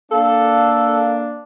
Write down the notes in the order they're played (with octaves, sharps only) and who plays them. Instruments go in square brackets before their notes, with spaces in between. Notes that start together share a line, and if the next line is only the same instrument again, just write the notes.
[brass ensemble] A#3 D4 [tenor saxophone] A4 [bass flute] F5